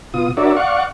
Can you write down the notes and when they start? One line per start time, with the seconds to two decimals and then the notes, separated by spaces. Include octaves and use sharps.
0.14 B2 F4 D#6
0.37 D4 F#4 A#4 C#5 D5 E5
0.56 D5 F5 F#5 C#6